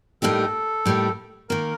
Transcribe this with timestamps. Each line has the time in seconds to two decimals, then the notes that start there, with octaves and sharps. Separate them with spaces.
0.22 A2 G3 A#3 D#4 G4 A4
0.86 A2 G3 A#3 D#4 G4
1.49 D#3 A#3 A#4